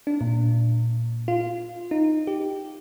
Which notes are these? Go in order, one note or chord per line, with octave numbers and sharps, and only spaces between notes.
D4
A#2
F4
D#4
G4